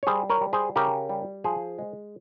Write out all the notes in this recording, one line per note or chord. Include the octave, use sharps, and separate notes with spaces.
C#5
G3 G#4 C5
A#4 C#5
G3
G#4 C5
C#3 G4 A#4
G3
F3 G#4 C5
G#3